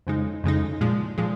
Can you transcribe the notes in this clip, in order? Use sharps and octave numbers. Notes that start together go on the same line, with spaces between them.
F2 C#3 G#3 D#4
F2 C#3 G#3 D#4
A#2 F3 G#3
A#2 F3 G#3